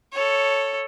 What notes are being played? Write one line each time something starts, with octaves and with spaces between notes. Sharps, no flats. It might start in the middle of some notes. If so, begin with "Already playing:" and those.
A4 C#5